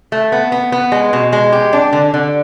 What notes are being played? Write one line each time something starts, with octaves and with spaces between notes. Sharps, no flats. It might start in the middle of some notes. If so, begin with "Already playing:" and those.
A3
B3
B3
B3
G#3
B2
G#3
G4
D4
D3
D3